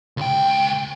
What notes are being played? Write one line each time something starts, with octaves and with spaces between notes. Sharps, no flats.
C#2 G5